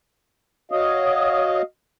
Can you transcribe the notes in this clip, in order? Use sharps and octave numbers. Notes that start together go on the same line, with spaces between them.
F#4 C#5 D#5 F5 D#6